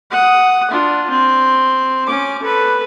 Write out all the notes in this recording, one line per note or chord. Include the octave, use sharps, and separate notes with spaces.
F#5 D#6
D4 F4
C4
C#4 D6
A4 B4